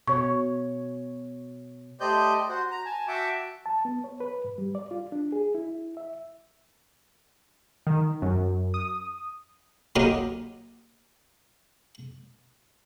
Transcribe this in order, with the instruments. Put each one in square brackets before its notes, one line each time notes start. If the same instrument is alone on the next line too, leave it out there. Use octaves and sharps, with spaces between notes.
[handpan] B2 C#5 [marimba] C#6
[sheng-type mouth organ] A3 G4 C5 D5 D#5 G6
F#4 C5
A#5
G#5 A5
F#4 E5 G5 A5 C#6 D6
[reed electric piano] A5
B3
C#5
B4
G#2
G3
D5
F4
D4
G#4
E4
E5
[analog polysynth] D#3
F#2
D#6
[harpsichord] F#3 A#3 D#4 F4 G4